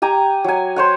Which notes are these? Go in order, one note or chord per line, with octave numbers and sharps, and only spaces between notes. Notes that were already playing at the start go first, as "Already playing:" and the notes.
G4 G#5 A#5
F#3 G#5
C5 C#5 F#5